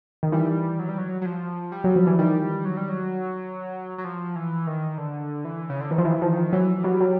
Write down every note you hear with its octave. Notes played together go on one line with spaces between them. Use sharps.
D#3
E3 G3
F#3
G3
F#3
F#3
F3
G3
F#3
F3
E3
D#3 G3
F#3
G3
F#3
F#3
F3
E3
D#3
D3
E3
C#3
D3
D#3 E3
F3
E3
E3
D#3 F3
E3 F#3
F#3 G3
F#3